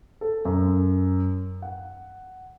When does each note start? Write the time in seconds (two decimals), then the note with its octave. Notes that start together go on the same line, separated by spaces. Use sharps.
0.21 A4
0.45 F#2
1.62 F#5